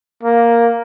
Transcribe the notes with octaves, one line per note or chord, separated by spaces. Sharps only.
A#3